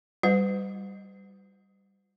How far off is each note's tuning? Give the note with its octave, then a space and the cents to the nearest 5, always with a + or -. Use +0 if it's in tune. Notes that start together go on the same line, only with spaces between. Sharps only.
G3 -5 B4 +45 F#5 -40